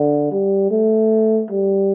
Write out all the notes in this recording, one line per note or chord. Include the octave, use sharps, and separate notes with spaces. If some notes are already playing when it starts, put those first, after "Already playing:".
Already playing: D3
G3
A3
G3